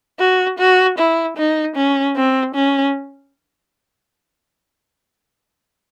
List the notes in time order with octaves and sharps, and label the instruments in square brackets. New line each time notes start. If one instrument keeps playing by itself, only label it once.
[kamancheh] F#4
F#4
E4
D#4
C#4
C4
C#4